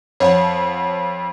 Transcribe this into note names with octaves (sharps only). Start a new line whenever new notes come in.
F2 C#5 F#5 A5